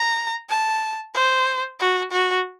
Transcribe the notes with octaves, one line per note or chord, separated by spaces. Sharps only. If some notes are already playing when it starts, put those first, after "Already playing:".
Already playing: A#5
A5
C5
F#4
F#4